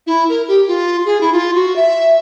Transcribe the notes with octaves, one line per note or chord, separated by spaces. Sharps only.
E4
A#4
G4
F4
G#4
E4
F4
F#4
E5